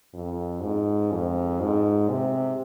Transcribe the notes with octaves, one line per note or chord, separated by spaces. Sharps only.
F2
G#2
F2
G#2
C3